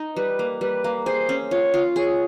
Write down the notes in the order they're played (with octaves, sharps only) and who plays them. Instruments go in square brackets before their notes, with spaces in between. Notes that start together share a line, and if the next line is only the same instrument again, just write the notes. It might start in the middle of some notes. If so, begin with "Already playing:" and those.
Already playing: [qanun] D#4
[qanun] G3 [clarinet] B4
[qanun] A#3
[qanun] G3 [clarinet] B4
[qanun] A#3
[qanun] G#4 [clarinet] C5
[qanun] C#4
[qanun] F4 [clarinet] C#5
[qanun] F4
[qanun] G#4 [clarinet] C#5